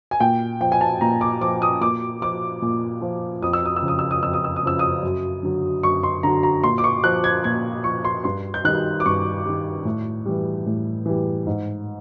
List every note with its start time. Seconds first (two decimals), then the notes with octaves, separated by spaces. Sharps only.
0.11 G#5
0.20 A#2 G5
0.61 F3 G5
0.72 G#5
0.81 A5
1.01 A#2 A#5
1.21 D6
1.41 F3 D6
1.62 D#6
1.81 A#2 D6
2.22 F3 D6
2.62 A#2
3.02 F3
3.42 F2 D#6
3.53 E6
3.65 D#6
3.76 E6
3.82 C#3 F3
3.88 D#6
3.99 E6
4.11 D#6
4.23 F2 E6
4.33 D#6
4.44 E6
4.56 D#6
4.63 C#3 F3 E6
4.79 D#6
5.03 F#2
5.43 D3 F#3
5.83 F#2 C#6
6.03 C6
6.23 D3 F#3 A#5
6.43 A#5
6.64 A#2 C6
6.78 D6
6.84 C#6
7.04 F3 F#6
7.24 G#6
7.44 A#2 G#6
7.84 F3 C#6
8.05 C6
8.24 G2 C6
8.54 G6
8.64 D#3 G3 F#6
9.00 D6
9.06 G2 C#6
9.46 D#3 G3
9.85 A2
10.26 E3 G3
10.66 A2
11.06 E3 G3
11.47 G#2